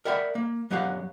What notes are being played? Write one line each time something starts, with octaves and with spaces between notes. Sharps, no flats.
A#4 D5 E5 F#5 G5 B5
A#3
F#2 F#3 B3 G4 F5 F#5